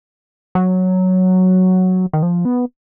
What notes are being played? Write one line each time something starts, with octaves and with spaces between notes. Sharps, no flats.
F#3
D#3
F3
B3